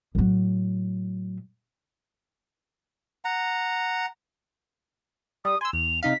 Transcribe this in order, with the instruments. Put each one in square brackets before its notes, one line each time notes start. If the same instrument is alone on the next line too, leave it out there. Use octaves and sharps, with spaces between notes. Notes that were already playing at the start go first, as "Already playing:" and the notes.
[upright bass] A2 F#3
[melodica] F#5 A#5
[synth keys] G3 [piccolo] D#6
[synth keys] G#5 E6 [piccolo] C6
[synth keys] E2 [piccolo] F7
[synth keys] C3 D#4 F5 [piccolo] B6